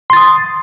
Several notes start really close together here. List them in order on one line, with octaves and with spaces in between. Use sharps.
C6 A6 D#6